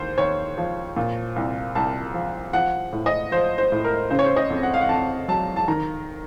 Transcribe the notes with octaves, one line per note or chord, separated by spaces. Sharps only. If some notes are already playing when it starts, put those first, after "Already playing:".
Already playing: D#2 C5
D#2 C#5
F3
A#2
C2
C2 A5
F3
F3 F#5
A2
D#5
F3 C5
C5
A2
A#4
C#3 C5
C#5
C5
D#5
F2
F#5
F5
F#5
F2 A5
F#3 A5
A5
D#3 A#5